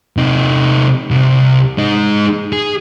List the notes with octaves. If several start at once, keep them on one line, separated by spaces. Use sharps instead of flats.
C3 D#4
C2
G#3 D#4
G#4